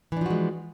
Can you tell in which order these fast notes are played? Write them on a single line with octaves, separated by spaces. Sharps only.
E3 D4 F3 F#4 G#3